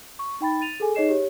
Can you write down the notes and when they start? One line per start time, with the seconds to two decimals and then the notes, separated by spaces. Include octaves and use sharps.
0.19 C#6
0.41 D#4 G5 B5 A6
0.61 A6 D#7 F7
0.80 G#4 A4 G#5
0.95 D#4 G#4 C#5 D#5 C7 E7
1.09 G4 C#5